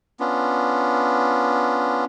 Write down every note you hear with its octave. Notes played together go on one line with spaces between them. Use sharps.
B3 C#4 D4 F4